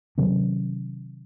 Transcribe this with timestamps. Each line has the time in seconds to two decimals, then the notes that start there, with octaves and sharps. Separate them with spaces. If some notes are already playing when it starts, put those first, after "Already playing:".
0.18 C3 D#3 F#3 C#4